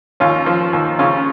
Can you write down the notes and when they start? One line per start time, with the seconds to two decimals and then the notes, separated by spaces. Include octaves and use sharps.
0.20 D#2 C#4 F4
0.46 F3
0.73 D#2
0.99 C#3 C#4 F4